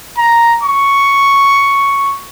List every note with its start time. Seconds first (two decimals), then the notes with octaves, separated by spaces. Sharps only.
0.18 A#5
0.63 C#6